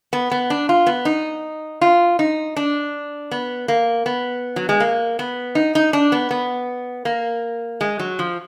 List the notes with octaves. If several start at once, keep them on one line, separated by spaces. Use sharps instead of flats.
B3
B3
D4
F4
B3
D#4
F4
D#4
D4
B3
A#3
B3
F#3
G#3
A#3
B3
D#4
D#4
D4
B3
B3
A#3
G#3
F#3
F3